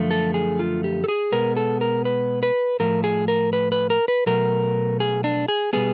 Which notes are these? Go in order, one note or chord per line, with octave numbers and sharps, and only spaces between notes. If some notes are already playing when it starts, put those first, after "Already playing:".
Already playing: F#2 D3 F3 A3
A4
G#4
F4
G4
A4
G#4
B2 G#3 B3 A#4
A4
A#4
B4
B4
A2 F3 A3 A#4
G#4
A#4
B4
B4
A#4
B4
B2 F#3 A3 A#4
G#4
D4
G#4
B2 G3 B3 G#4